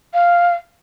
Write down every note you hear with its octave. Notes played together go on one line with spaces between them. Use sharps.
F5